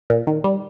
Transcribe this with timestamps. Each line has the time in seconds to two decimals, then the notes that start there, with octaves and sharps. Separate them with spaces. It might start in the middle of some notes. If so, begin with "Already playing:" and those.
0.10 A#2
0.27 D#3
0.44 G3